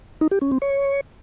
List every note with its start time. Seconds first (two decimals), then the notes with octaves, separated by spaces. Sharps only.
0.21 D#4
0.31 G4
0.41 C#4
0.52 C4
0.62 C#5